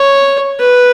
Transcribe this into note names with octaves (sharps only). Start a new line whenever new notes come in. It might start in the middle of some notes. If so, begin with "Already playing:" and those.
Already playing: C#5
B4